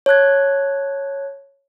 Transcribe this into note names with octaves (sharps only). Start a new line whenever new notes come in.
C#5 A5 F#6 G#6